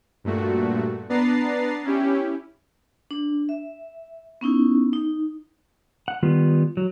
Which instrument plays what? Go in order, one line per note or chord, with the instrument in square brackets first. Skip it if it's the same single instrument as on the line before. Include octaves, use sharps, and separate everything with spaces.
[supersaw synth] G2 A#2 A3 F#4
B3 D4 B4 A#5 A6 C7
C#4 E4 G4
[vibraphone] D4
E5
B3 C#4 D#4 E4
D#4
[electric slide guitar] F#5
D#3 G3 B3 F4
F#3